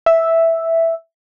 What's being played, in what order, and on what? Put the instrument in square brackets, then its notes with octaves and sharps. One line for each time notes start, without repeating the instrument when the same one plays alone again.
[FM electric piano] E5